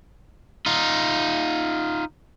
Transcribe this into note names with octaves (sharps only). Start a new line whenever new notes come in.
D#4 F4